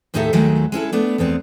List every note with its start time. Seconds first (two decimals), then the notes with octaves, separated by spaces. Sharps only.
0.14 D#2 A2 D#4 G#4 A4 E5
0.33 D#2 D#3 F#3 G#3 A3
0.72 G#3 C#4 E4 A4
0.93 A3 B3 D4
1.18 E2 G#3 B3 C4